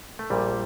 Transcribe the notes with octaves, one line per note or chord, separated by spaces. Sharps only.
A3
A#1 A#2 G3